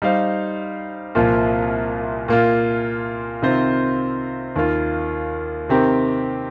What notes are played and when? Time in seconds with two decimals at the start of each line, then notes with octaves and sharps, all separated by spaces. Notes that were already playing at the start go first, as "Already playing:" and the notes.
0.02 G3 D#4 C5 F5
1.15 C2 A#2 F3 A#3 F4
2.28 A#2 A#3 F4
3.42 C3 D#3 C4 F4 C5
4.56 D#2 D#3 A#3 F4
5.69 C3 D#3 C4 G4 A#4